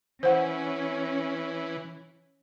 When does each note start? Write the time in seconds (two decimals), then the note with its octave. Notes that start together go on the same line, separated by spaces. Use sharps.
0.23 E3 C#4 C5 F#5